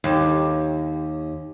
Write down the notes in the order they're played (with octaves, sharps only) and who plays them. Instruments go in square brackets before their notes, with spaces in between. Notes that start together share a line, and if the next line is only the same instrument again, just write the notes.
[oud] D#2